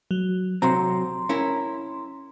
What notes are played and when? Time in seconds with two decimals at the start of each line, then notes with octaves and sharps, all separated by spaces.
0.11 F#3
0.62 C3 F#3 C4 A#5 C6
1.29 C#4 E4 A#4